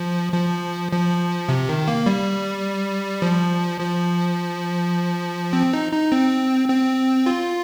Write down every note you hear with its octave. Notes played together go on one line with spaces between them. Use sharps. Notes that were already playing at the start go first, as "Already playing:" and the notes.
Already playing: F3
F3
F3
C3
D#3
A#3
G3
F3
F3
C4
D#4
D#4
C4
C4
F4